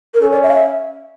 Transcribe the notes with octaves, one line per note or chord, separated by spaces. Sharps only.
A#4
C#4 A4
D5
E5
F5
E5